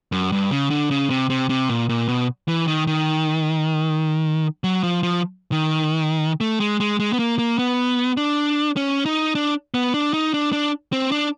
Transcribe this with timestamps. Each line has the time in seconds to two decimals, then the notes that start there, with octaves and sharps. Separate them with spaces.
0.12 F#2
0.32 G2
0.51 C#3
0.70 D3
0.91 C#3
1.10 C3
1.30 C3
1.50 C3
1.69 A#2
1.89 A#2
2.08 B2
2.48 E3
2.68 D#3
2.87 D#3
4.64 F#3
4.83 F3
5.03 F3
5.52 D#3
6.41 A3
6.60 G#3
6.80 G#3
7.00 G#3
7.13 B3
7.19 A#3
7.39 A#3
7.59 B3
8.17 D4
8.77 C#4
9.06 D#4
9.35 D4
9.74 B3
9.94 D4
10.13 D#4
10.34 D4
10.53 D4
10.93 C4
11.12 D4